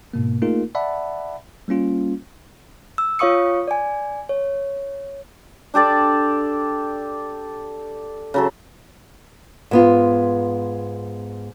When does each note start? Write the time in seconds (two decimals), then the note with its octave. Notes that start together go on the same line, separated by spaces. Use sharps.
0.13 G#2 B2 A#3
0.42 A3 A#3 D#4 F4 G#4 A#4
0.75 D5 E5 F#5 A5 B5
1.68 G3 A#3 C#4 F4
2.98 E6
3.19 F4 C#5 F5 C#6 D#6 C#7
3.68 D5 G#5
4.29 C#5
5.74 D4 G4 A4 D5
8.34 C#3 F#3 A4
9.71 G#2 B3 F4